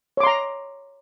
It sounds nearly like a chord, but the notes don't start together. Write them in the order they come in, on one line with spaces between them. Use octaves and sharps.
C#5 D6 C6 A#5